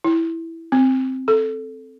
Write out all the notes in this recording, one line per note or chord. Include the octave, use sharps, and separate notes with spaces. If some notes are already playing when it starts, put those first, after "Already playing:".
E4
C4
A4